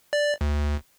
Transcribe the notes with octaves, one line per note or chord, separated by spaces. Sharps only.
D5
D2